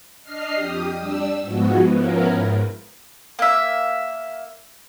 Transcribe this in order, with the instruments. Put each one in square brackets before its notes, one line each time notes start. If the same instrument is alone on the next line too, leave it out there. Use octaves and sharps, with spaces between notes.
[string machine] D4 D#5 F6 C7
F2 G4 D#6
G3 D4 E6
G#2 F3 G#3 B3 F#4
F3 B3 C#4 E4 A#4
G#2
[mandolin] A#3 E5